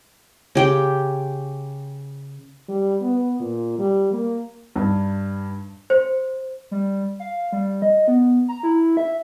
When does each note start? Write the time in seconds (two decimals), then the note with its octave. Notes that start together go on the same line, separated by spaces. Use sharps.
0.55 C#3 G4 G5
2.69 G3
3.01 B3
3.40 A#2
3.79 G3
4.13 A#3
4.76 G2
5.90 C5
6.71 G3
7.20 F5
7.52 G3
7.82 D#5
8.08 B3
8.48 A#5
8.63 E4
8.97 E5